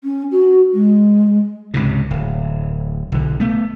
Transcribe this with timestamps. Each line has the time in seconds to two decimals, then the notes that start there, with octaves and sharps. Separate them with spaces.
0.04 C#4
0.31 F#4
0.73 G#3
1.74 C#2 G#2 C3
2.11 D1
3.12 B1 D3
3.40 A3 B3